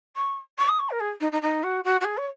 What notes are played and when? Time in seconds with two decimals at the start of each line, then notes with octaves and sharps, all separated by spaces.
0.16 C#6
0.58 C#6
0.68 D#6
0.79 C#6
0.90 A#4
1.00 G#4
1.20 D#4
1.32 D#4
1.42 D#4
1.63 F#4
1.84 F#4
2.00 F#4
2.04 G#4
2.17 C#5